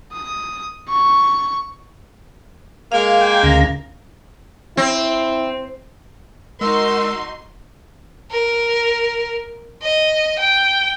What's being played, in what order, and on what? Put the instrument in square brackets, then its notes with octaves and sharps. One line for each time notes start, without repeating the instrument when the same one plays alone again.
[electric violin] D#6
C#6
[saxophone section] G#3 A#3 [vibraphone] F5
[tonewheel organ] G5
D2 C#3 A#5
[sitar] C4 [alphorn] E4
[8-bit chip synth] G#3 [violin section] D#4 F#4 C6 [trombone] A#4 [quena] E6
[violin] A#4
D#5
G5